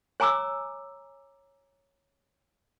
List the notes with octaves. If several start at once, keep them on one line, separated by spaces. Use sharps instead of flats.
C#5 G#5 A#5 D6 E6